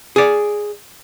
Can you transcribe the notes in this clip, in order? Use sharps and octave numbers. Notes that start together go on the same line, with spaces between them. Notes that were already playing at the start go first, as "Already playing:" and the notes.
G#4 D5